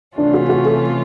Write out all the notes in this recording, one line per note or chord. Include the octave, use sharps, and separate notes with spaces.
C3 E3 A3 C#4 D4 F4
F#4
F#4
A4